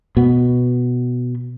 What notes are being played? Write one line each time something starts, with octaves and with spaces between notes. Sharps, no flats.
B2 B3